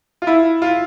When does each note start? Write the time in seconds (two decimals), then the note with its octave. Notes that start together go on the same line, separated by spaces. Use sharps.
0.22 F4
0.27 E4
0.62 F4